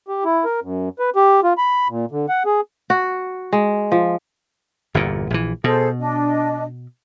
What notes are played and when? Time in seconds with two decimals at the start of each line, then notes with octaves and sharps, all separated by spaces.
0.08 G4
0.25 E4
0.45 A#4
0.62 F#2
0.99 B4
1.16 G4
1.43 F4
1.58 B5
1.89 A#2
2.11 D3
2.29 F#5
2.45 G#4
2.90 F#4
3.53 G#3
3.92 F3
4.94 G1 E2 A#2
5.30 A#1 E3
5.64 B2 G#4 A4 C5
5.99 D4 D#5